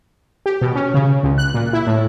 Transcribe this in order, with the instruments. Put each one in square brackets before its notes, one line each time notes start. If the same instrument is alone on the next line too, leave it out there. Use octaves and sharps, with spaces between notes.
[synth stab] G4
B2
C#4
C#3
C#2
F#6
A#2
E4
A2